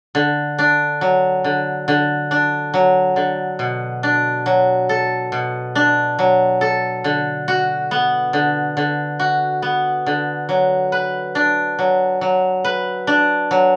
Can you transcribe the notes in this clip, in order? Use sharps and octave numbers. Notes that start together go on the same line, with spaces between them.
D3
D4
F#3
D3
D3
D4
F#3
D3
B2
D4
F#3
A4
B2
D4
F#3
A4
D3
F#4
B3
D3
D3
F#4
B3
D3
F#3
B4
D4
F#3
F#3
B4
D4
F#3